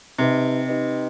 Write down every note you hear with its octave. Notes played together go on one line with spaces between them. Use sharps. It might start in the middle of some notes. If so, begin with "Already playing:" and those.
C3 D#4 G4 B4 D#5
D#4 G4 B4 D#5